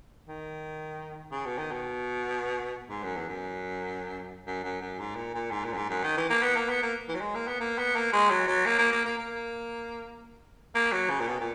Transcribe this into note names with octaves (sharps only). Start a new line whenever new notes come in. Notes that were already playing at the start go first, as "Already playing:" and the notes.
D#3
C#3
B2
D#3
B2
G#2
F#2
E2
F#2
F#2
F#2
F#2
G#2
A#2
A#2
G#2
A#2
F#2
G#2
F#2
D#3
E3
A#3
B3
A#3
B3
A#3
E3
F#3
G#3
A#3
B3
A#3
B3
A#3
G#3
F#3
F#3
A#3
A#3
A#3
A#3
A#3
A#3
F#3
C#3
A#2
B2
A#2